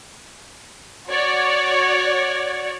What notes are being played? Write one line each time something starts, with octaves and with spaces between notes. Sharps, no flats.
F#4 C#5 D5